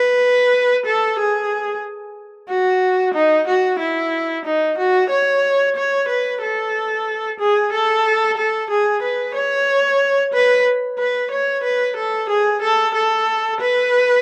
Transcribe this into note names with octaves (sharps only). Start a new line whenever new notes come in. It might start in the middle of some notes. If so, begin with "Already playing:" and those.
Already playing: B4
A4
G#4
F#4
D#4
F#4
E4
D#4
F#4
C#5
C#5
B4
A4
G#4
A4
A4
G#4
B4
C#5
B4
B4
C#5
B4
A4
G#4
A4
A4
B4